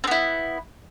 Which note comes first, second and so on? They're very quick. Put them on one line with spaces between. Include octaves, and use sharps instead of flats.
C4 B3 E4